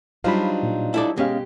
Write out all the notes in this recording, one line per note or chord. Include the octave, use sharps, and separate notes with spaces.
F#3 G3 D4 D#4 F4 C5 F5 B5
A#2
E4 A4 D5
B2 G#3 B3 C#4 G4 F5